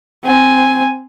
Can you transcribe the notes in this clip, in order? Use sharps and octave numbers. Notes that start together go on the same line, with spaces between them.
C4 G#5